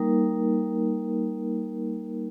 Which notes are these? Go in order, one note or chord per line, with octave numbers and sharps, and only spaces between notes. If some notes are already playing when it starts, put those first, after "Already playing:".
Already playing: G3 A#3 D#4 A#4